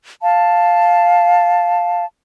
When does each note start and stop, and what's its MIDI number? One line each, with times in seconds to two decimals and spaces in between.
0.21 2.04 77
0.21 2.04 81